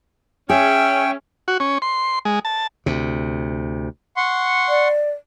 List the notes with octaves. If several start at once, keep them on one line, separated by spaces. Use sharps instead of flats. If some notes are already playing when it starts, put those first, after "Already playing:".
C#4 G#4 E5 G5
F#4
C#4
C6
G#3
A5
D2 C3
F#5 C6 C#6
D5